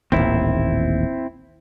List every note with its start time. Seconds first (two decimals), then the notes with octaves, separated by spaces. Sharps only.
0.12 D#1 A1 D#2 C4 E4